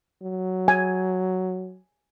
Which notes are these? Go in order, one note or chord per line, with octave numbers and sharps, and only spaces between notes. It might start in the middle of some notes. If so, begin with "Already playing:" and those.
F#3
G#5